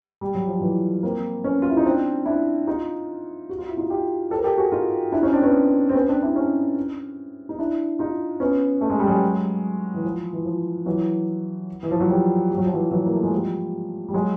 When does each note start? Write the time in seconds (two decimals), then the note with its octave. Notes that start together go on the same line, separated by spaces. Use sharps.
0.21 G3
0.35 F#3
0.48 F3
0.60 E3 F#3
1.03 A#3 C4
1.44 B3 C#4
1.62 F4
1.70 E4
1.77 D#4
1.85 C4 D4
2.26 D4 E4
2.67 D#4 F4
3.49 F#4
3.58 F4
3.69 E4
3.77 D#4 F4
3.90 F4 G4
4.30 G4 A4
4.38 A#4
4.44 G4 A4
4.58 F#4 G#4
4.72 D#4 F4
5.12 D4 E4
5.23 C#4 D#4
5.33 C4 D4
5.43 B3 C#4
5.89 C4
5.94 B3 C#4
6.08 C4 D4
6.22 D4 E4
6.35 C#4 D#4
7.49 D#4
7.59 D4 E4
7.99 D#4 F4
8.40 B3 C#4
8.81 A3
8.90 G#3
8.99 G3
9.08 F#3 G#3
9.94 E3
10.04 F3
10.33 E3
10.45 F3
10.86 E3 F#3
11.83 E3
11.91 F3
12.00 F#3
12.09 F3 G3
12.51 G3
12.57 F#3
12.65 F3
12.73 E3 F#3
12.91 E3 F#3
13.06 A#3
13.15 A3
13.23 G#3
13.32 F3 G3
14.08 G3
14.14 F#3 G#3